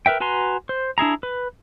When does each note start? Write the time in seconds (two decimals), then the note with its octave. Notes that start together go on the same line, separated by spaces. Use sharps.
0.06 A#4 B4 E5 G5
0.20 F#4 B4 G#5 A#5 C6
0.69 C5
0.98 D4 E4 G#4 A#5
1.23 B4